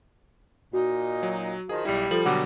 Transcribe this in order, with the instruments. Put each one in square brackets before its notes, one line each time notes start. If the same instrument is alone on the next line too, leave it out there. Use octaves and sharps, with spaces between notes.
[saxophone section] A#2 D#4 [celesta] F#4
[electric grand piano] F#3
[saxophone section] D#3 F3 [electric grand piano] G#4
[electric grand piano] B1 E4 [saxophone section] G3
[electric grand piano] F3 [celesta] F4 A4 F#7
[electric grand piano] B2 D3 F#3 [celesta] F#5 D6